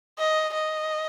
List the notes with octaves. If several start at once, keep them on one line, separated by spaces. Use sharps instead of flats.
D#5
D#5